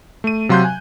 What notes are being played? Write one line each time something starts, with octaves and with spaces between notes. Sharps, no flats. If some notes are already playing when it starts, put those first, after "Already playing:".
A3 D#7
C3 F#3 F5 C6 F#6 G6
G#5